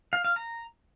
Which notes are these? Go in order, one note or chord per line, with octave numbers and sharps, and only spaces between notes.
F5
F5
A#5